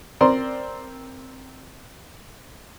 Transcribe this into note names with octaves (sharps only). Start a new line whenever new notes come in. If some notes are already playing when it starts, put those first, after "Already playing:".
C4 A#4 C5 D5 A#5 C6